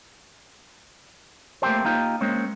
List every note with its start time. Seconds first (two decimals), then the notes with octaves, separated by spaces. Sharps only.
1.62 A3 A#3 C4 G4 C5
1.85 A#3 D#4 F4 G4
2.21 G#3 A#3 C4 C#4